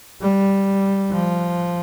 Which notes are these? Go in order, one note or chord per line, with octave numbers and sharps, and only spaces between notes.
G3
F3